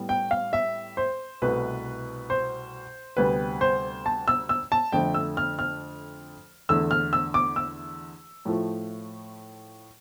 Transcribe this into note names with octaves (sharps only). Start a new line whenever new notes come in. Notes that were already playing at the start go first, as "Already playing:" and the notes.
Already playing: A2 G3 B3
G5
F5
E5
C5
C2 B2 A3 B4
C5
D2 C3 G3 B3 B4
C5
A5
E6
E6
A5
F2 D3 A3 G5
E6
F6
F6
E2 D3 A3 E6
F6
E6
D6
E6
A2 F3 A3